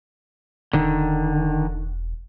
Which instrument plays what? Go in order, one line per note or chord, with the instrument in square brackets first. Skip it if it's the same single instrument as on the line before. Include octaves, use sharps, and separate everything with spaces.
[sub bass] E1 [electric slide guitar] D3 D#3